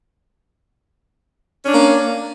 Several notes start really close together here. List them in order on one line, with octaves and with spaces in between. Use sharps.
C#4 D4 A#3